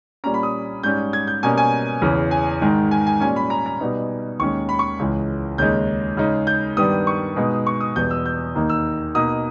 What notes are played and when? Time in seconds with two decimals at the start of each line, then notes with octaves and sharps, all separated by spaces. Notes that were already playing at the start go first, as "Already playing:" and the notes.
0.24 A#2 G3 C#4 A#5
0.34 B5
0.43 D#6
0.83 G#2 G3 C#4 G6
1.13 G#6
1.27 G6
1.43 B2 G3 A#3 C#4 G#5
1.58 G#5
2.02 E2 C#3 E3
2.31 G#5
2.62 G#2 D#3 G#3
2.91 G#5
3.07 G#5
3.20 A#2 G3 C#4 G#5
3.36 B5
3.50 A#5
3.66 A#5
3.80 B2 G3 B3 D#4
4.39 D#2 D#3 G#3 C#4 C#6
4.69 B5
4.79 C#6
4.99 C#2 C#3 E3 G#3
5.58 D#2 C#3 G#3 D#4 G6
6.17 C#3 G#3 D#4
6.47 G6
6.77 G2 D#3 G3 B3 D#6
7.07 C#6
7.36 B2 G#3 B3 D#4
7.67 C#6
7.80 D#6
7.96 E2 B2 G3 B3 G6
8.11 E6
8.26 G6
8.55 D#2 D#3 A#3 D#4
8.70 E6
9.15 B2 A#3 D#4 D#6